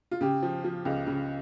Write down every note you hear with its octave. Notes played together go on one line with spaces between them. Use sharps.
F4
C#3 G4
F3
F3
C#2
C#3